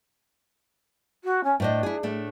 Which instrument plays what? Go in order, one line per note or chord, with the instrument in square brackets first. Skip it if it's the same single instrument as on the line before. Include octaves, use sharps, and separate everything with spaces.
[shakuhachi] F#4
C#4
[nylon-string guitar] A2 C5 D#5 [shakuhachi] D4
[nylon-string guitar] E4 G#4
A2 A3 D4